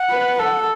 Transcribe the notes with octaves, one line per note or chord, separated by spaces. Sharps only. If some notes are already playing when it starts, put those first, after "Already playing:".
Already playing: F#5
B4
A4